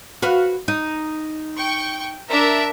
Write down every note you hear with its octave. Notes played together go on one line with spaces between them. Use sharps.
F#4 B4 F5
D#4
G5 C#6
D4 A#4 E5